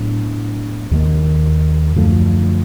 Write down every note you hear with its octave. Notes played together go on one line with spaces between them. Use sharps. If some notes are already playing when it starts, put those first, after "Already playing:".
Already playing: A2 F#3 B3 D4
D#2 D#3 F#3 A#3
F#2 D3 F3 A3